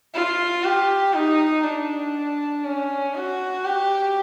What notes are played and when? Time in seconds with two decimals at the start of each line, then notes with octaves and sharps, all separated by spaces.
0.14 F4
0.64 G4
1.14 D#4
1.64 D4
2.64 C#4
3.15 F#4
3.65 G4